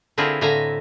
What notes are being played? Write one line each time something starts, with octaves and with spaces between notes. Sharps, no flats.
D3 C4 E4 F4 G#4 A#4
A2 D3 E5 F5 G#5 A#5